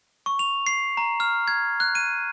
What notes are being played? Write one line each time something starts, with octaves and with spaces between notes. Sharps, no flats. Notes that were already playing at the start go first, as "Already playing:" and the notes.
C#6
F7
C7
A#5
F6
G#6
F#6
D#7